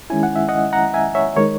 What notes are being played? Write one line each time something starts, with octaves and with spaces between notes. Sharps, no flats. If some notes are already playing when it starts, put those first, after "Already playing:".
D#3 G#3 C#4 E4 G#5
F#5
E5
D#5 F#5
F#5 A#5
E5 G#5
C#5 E5
D#3 G#3 D#4 A#4 C#5